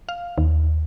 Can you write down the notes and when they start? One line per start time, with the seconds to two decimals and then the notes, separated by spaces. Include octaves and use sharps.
0.09 F5
0.38 D#2